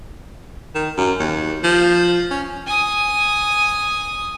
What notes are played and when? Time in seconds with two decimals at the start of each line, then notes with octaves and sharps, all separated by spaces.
0.75 D#3
0.98 F#2
1.19 D#2
1.64 F3
2.31 C#4
2.67 G#5 D#6